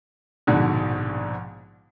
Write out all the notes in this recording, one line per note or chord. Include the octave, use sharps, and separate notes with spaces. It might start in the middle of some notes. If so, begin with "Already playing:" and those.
A#1 G#2 B2 D3